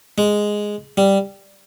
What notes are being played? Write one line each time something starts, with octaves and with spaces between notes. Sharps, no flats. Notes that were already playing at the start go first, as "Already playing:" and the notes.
G#3
G3